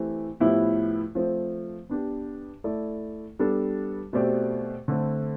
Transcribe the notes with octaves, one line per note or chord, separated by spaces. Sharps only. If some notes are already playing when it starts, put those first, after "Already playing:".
Already playing: E3 A3 C4 G4
A2 F3 B3 E4 G4
F3 A3 C4
B3 D4 G4
A3 E4 A4 D5
G3 B3 D4 A4
B2 A3 C4 G4 D5
D3 A3 C4